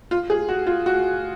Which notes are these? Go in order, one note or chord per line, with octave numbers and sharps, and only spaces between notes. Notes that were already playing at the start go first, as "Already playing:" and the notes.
F4
G#4
F#4
F4
F#4